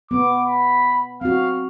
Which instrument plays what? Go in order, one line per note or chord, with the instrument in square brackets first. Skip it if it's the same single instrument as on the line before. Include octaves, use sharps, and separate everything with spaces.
[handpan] B3 [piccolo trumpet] D6
[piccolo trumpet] B5
[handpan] C4 F#4 [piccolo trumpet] F5